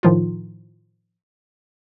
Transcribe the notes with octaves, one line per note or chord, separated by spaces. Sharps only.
A2 D#3 F3 D#4 F4